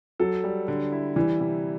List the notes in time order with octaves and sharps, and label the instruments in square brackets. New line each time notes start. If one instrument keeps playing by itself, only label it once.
[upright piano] F#3 [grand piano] A4
[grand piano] G3
D3
E4
[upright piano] E3 [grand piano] G3
[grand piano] C3